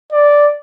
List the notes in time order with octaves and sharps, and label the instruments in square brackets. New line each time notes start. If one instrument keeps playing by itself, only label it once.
[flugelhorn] D5